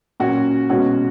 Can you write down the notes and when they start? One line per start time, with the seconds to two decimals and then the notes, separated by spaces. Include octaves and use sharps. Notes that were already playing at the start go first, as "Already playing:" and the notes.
0.20 A#2 F#3 C#4 F#4
0.70 B2 G#3 C#4 F#4